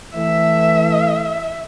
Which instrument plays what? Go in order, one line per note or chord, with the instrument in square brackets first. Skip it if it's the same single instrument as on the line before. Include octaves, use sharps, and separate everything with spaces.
[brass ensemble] E3 A3 [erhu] E5